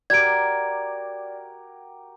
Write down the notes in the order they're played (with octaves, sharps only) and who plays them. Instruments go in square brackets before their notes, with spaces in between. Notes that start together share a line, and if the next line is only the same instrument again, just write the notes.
[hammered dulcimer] F#4 G4 A#4 [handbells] D5 [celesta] G#6 D7